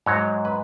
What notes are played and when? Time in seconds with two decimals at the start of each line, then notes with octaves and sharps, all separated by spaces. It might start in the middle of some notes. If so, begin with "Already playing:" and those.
0.06 G#2 F#3 C#5
0.45 B4